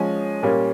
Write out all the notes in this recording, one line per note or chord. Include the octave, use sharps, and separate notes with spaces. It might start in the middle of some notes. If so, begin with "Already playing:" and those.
Already playing: F3 G#3 C#4 G#5
A#2 G3 A#3 C#4